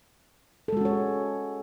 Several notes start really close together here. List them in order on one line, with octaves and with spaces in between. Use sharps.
A4 G#3 F#4 C#4 C#5